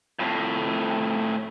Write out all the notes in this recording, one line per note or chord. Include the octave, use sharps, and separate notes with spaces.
F2 A2